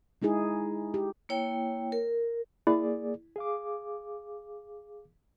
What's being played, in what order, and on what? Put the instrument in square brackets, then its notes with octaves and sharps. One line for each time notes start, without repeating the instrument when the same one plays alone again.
[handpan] G#3 D#4 E4 G#4
G4
[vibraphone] A#3 E4 C#5 G5
A#4
[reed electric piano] A#3 G#4 D5 [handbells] E4
[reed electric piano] G#4 F5 D6